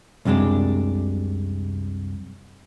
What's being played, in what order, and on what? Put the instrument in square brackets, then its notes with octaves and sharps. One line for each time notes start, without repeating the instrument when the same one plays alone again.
[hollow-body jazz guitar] C2 F#2 C3 G#3 D4